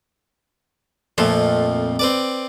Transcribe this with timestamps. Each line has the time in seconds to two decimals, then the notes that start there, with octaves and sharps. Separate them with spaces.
1.18 F2 A#2 F3 A3
1.99 C4 B4 D5